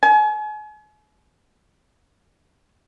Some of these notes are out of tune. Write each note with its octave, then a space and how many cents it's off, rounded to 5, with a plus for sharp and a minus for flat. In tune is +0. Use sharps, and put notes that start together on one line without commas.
G#5 +40